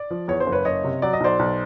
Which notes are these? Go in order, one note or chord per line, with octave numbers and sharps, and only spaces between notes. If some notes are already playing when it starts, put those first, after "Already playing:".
Already playing: D5
F3
E2 C#5
C5
F#1
B4 C#5
F#1 C#5 D#5
C3
F#3 D5
D#5
B1 C5 D5
B1